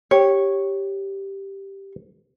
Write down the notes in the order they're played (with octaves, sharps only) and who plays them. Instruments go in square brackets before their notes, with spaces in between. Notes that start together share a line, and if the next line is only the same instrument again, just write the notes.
[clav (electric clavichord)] G4 [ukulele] C#5